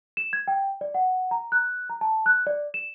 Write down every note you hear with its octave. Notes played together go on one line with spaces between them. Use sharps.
E7
G#6
G5
D5
F#5
A#5
F#6
A#5
A5
F#6
D5
E7